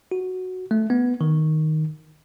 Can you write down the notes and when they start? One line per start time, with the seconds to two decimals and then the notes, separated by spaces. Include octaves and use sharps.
0.12 F#4
0.71 A3
0.90 B3
1.21 D#3